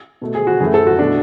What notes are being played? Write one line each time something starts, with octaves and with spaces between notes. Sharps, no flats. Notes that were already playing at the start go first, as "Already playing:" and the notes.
B2 A3
G#4
F#4
F#2 E3 A3 G#4
A4
F#4
B2 A3 D4